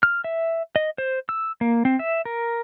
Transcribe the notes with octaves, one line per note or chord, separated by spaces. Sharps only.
F6
E5
D#5
C5
E6
A#3
C4
E5
A#4